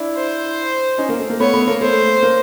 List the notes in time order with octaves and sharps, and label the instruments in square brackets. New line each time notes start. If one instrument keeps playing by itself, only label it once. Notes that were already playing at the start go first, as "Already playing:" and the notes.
Already playing: [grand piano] D4 E4
[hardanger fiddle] C5
[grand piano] C#4 D#4
A#3
A3
A#3
[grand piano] A3 B3 [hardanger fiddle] C#5
[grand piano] A3 B3
A#3
[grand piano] A3 [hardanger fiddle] C5
[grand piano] A#3